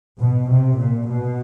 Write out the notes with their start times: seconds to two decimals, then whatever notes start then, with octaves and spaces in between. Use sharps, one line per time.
0.20 B2
0.48 C3
0.78 A#2
1.07 B2